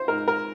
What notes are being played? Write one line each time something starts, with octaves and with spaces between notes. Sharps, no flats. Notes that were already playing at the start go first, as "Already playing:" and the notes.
Already playing: C5
G#2 A#4
A#4